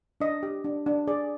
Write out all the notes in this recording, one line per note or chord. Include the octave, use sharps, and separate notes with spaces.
D4 D#5
G4
D4
D4
G#4 D5